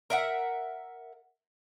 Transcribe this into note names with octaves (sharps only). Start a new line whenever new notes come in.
A#4 E5 F#5